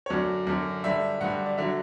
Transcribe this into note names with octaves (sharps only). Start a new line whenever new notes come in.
C#5
F#2 D3 F#3 D5
F#2 D3 F#3
G2 D3 G3 E5
G2 D3 G3 F#5
D5
D3 F#3 E5